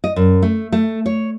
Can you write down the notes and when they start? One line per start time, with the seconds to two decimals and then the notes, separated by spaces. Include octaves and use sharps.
0.04 D#5
0.16 F#2
0.42 A3
0.72 A3
1.06 C#5